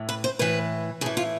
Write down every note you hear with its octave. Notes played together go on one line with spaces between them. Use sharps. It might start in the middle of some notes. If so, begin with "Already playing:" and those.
Already playing: A2 E3
B4
C5
A2 E3 B4
A2 E3 G#4
F4